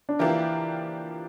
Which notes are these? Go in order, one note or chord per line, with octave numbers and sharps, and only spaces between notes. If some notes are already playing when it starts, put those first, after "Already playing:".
D4
E3 F3 A#3 D4 E4 G4 A#4